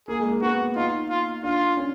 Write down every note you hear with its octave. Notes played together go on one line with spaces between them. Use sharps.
A#3 G#4
G#3
A#3
B3 F#4
D#4 F4
F4
D4 F4
C#4